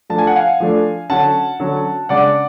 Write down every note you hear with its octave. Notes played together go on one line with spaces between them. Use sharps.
F3 A3 D4 A5
G#5
F#5
F5 G#5
F3 A3 D4
D3 F#3 C#4 F#5 A5
D3 F#3 C#4
C#3 G#3 D4 D5 F#5